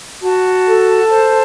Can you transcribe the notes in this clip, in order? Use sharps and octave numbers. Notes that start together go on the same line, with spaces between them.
F#4 A5
A4
C5